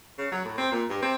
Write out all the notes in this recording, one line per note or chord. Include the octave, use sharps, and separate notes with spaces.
C#3
F#3
A2
C4
A#2
G2
C4